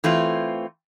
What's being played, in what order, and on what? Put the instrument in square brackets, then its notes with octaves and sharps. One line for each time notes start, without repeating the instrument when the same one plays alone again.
[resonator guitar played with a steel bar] E3 A3 C4 F4